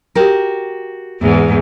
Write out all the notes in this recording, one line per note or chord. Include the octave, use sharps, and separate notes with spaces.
F#4 G4 A#4
E2 G#2